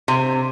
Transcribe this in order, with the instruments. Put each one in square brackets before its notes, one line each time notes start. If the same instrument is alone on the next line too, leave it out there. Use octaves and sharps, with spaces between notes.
[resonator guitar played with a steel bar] C3